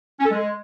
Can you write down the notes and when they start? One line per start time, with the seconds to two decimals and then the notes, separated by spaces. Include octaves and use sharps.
0.20 C#4
0.26 A4
0.31 G#3